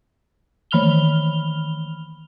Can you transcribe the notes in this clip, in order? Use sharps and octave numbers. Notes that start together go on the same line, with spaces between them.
D#3 E3 B5 F6 F7 G7